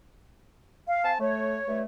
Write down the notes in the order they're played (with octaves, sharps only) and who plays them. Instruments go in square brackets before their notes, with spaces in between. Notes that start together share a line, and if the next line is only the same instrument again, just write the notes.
[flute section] F5
[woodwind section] C4 G#5 A5
[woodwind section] A3 [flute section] C#5
[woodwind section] G2 A3